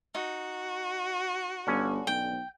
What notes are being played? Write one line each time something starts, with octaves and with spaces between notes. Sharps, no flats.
D#4 F#4
G1 D3 C#4
B1 G5